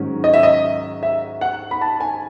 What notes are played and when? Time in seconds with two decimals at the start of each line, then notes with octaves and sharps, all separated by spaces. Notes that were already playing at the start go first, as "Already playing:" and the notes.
Already playing: G#2 D#3 F#3 C#4
0.24 D#5
0.34 E5
0.43 D#5
1.03 E5
1.41 F#5
1.71 B5
1.81 A5
2.00 G#5